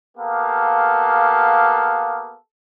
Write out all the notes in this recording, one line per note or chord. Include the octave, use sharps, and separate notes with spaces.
A#3 B3 G4 A4 F5